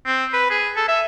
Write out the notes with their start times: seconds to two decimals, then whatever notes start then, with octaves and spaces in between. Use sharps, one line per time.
0.06 C4
0.33 B4
0.50 G#4
0.76 A4
0.88 E5